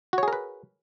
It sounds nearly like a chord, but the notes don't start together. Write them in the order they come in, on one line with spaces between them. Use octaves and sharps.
F#4 C#5 G#4 A#4 B4